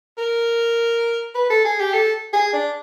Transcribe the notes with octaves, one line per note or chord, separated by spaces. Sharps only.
A#4
B4
A4
G#4
G4
A4
G#4
D4